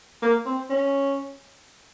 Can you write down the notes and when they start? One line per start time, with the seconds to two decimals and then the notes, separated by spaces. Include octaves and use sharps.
0.22 A#3
0.46 C4
0.70 C#4